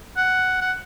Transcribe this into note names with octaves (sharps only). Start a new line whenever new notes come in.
F#5
F#5